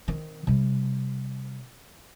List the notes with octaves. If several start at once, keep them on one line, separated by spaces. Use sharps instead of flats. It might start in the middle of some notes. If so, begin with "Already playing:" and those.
D#3 C4
C3 G3